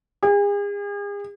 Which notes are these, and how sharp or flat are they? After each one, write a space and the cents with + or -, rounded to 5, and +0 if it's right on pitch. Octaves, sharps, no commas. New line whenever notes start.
G#4 -40